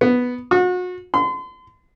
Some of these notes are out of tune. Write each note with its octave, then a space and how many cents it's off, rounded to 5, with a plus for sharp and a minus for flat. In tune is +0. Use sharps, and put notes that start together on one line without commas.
B3 +0
F#4 -35
C6 -40